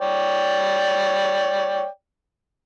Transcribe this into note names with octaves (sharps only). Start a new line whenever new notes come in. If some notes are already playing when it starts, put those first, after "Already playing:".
C#5 D5 G5